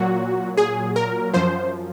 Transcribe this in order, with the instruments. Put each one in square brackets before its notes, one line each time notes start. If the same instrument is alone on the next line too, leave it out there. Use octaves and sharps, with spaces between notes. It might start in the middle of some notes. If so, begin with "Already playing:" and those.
Already playing: [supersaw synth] A#2 F#3 F#4
G#4
A#4
F#2 F3 C5